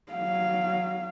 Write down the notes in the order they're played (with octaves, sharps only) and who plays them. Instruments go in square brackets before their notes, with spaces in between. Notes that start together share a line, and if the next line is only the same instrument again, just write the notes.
[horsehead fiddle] F#3 F5